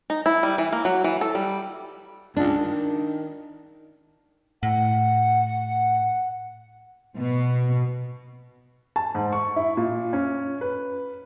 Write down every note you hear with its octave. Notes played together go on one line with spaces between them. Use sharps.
D#4
E4
G3
E3
A#3
F#3
E3
A4
G3
C#2 D4
D#3
A2 F#5
B2
A5
G#2
C#6
E4
A#2
C#4
B4